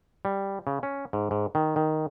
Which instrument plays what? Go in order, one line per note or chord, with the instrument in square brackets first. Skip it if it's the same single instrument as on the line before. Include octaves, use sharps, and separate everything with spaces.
[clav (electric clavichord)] G3
C#3
C#4
G#2
G#2
D#3
D#3